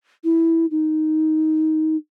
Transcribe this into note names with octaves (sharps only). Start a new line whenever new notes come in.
E4
D#4